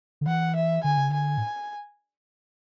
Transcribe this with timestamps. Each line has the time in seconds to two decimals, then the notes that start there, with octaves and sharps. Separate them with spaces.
0.21 D3
0.27 E3 F#5
0.55 E5
0.84 D3 G#5
0.97 C#3
1.10 D3 G#5
1.38 A2